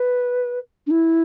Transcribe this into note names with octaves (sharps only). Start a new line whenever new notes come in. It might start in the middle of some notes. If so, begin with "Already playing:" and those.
Already playing: B4
D4
E4